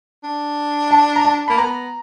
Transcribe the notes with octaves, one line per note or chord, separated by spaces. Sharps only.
D4
A5
A#5
A5
A#3 B5
B3 A#5